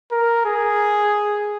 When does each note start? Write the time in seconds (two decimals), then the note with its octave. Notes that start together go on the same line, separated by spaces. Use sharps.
0.12 A#4
0.45 G#4